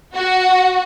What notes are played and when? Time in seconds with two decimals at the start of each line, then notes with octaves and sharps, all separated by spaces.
0.14 F#4